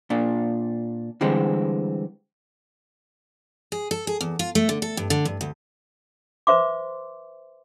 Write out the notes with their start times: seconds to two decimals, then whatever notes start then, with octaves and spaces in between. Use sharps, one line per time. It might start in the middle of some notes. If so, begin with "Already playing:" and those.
0.10 A#2 D4
1.21 D3 E3 G3 G#3 C4
3.72 G#4
3.91 A4
4.07 G#4
4.21 E2
4.39 F4
4.55 A3
4.69 D3
4.82 A4
4.97 G2
5.10 D3
5.25 G2
5.41 D2
6.47 B4 C5 E5 C6 D6